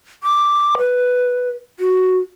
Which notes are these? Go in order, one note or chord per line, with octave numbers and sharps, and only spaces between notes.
D6
B4
F#4